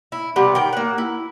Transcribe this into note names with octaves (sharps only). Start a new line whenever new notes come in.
E4
C3 F3 G3 B3
D#3 G5
A#3 F#5
E4